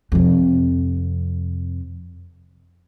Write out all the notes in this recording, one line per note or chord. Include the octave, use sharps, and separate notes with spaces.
F2 C3